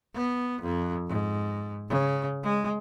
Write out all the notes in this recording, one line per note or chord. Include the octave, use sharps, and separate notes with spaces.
B3
F2
G#2
C#3
G#3